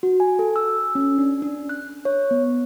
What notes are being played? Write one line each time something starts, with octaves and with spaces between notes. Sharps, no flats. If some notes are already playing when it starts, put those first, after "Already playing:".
F#4
G#5
A4
E6
C#4
D4
D4
F#6
C#5
B3